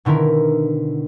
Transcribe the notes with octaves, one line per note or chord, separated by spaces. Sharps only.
B2 D3 D#3 E4 A#4